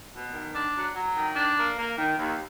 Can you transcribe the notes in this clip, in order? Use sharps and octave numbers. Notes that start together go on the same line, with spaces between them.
B2
D#3
D4
F#3
F#3
D#3
D4
A#3
A#3
D#3
D#2